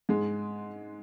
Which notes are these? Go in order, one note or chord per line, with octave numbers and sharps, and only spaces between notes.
G#2 G#3